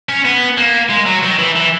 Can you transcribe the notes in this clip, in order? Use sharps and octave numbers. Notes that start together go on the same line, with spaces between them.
C#4
B3
A#3
G#3
F#3
D#3
E3
E3